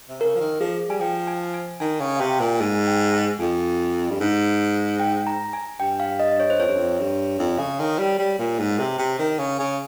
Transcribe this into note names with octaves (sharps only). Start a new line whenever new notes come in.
C3
C#3 A#4
F3
D#3
F3 G#4
G3 G#5
F3 G5
G#5
G#5
D#3 G#5
C#3
F5
C3 G5
A#2
G#2 G#5
G5
G#5
F2 G#5
G2
G#2
G5
A#5
G#5
G2 G5
F5
D#5
C#5
C5
F2 C#5
G2
F2
G2
F2
C#3
D#3
G3
G3
A#2
G#2
C3
C3
D#3
C#3
C#3